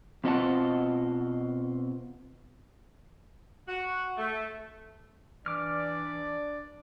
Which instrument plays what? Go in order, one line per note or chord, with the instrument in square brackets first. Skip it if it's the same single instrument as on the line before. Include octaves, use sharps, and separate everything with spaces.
[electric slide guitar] B2 C4 F4 D#5 F#5 A5
[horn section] F#4
A3
[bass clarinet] E3 [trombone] D4 [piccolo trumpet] D5 [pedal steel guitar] D6 F6